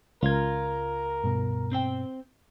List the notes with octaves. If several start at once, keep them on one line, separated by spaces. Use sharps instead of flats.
C#2 F4 A#4 G#6
G2 B2
C4 C5 G5